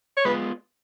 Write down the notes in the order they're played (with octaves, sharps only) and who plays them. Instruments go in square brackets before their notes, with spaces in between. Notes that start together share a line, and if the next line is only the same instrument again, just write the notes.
[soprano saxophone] C#5
[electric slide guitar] G#3 B3 F4 [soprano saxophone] B4